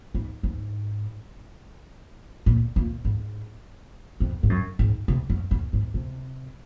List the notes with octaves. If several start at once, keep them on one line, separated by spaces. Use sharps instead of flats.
G#2
G#2
A#2
A#2
G#2
F2
G#2
F#2
G#2
C3
F#2
F#2
G#2
C3